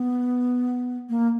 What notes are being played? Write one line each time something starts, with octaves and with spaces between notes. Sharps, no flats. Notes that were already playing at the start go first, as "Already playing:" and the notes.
Already playing: B3
A#3